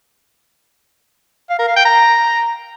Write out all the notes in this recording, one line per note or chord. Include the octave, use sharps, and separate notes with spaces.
F5
A#4
F5
G5
A#5